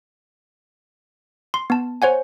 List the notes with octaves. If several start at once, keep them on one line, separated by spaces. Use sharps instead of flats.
C6
B3 A5
C5 C#5 F#5 G#5